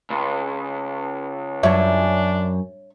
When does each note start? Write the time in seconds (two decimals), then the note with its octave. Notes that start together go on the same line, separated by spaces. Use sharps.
0.10 C#2
1.63 F#2 D4 C#5 E5